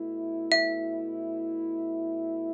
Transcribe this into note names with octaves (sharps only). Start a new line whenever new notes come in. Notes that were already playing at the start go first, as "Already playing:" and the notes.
Already playing: B2 A3 E4
E5